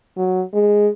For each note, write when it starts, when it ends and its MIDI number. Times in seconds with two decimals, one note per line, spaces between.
0.17 0.42 54
0.53 0.88 56